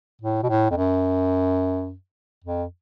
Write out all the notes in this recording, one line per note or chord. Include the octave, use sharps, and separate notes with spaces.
A2
B2
A2
F2
F#2
F2